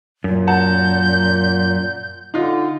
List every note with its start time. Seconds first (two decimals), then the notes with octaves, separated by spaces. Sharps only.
0.24 F#2 A#2
0.47 F#5 A5 A#5 G6
2.34 D3 D#4 F4